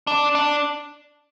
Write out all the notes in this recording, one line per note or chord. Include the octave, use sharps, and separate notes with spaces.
D4
D4